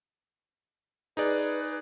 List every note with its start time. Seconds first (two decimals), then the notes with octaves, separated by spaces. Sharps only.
1.17 D#4 G#4 B4 D5